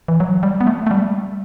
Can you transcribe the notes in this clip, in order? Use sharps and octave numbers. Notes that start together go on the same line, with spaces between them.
E3
F#3
G3
B3
A3
A3
G3